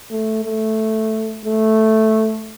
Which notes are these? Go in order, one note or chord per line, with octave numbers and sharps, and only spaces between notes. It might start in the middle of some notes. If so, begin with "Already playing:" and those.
A3
A3
A3